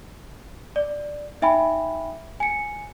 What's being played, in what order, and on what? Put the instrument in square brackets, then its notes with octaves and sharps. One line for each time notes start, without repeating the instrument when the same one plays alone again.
[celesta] D5
D#4 E5 G5 G#5 B5
G#5 C#7